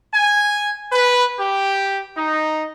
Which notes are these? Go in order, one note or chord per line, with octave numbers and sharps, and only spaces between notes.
G#5
B4
G4
D#4